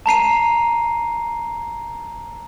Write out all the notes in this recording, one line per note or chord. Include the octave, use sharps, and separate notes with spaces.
A5 A#5 C7 D#7